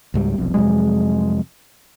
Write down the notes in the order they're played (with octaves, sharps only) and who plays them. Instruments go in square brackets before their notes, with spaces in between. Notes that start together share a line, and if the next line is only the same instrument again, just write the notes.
[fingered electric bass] C#2 G#2 G3
F1 B1 F2
[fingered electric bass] F2 C3 F#3 [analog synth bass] G#3